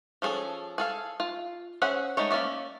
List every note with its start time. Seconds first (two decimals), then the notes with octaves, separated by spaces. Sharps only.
0.22 F3 C#4 G#4 A4
0.78 G#4 A4 F5
1.20 F4
1.82 C#4 G#4 C5 E5 F#5
2.17 G#3 A3 D#4 C#5
2.31 A#3 C#4 D5 E5